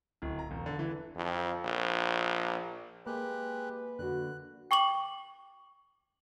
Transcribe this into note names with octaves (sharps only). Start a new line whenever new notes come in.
D1
A#5
E1
D3
E3
F2
A#1
G#3 A#3 G4 B4 F#6
D3 F#4 F#6
G5 C#6 D6 F#7